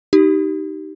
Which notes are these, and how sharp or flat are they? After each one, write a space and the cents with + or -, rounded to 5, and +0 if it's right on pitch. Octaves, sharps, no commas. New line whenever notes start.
D#4 +0 G4 -20